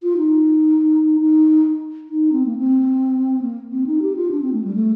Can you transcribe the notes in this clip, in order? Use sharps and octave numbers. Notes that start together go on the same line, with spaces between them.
F4
D#4
D#4
D#4
C4
A#3
C4
A#3
C4
D#4
G4
F4
D4
C4
A3
G3
A3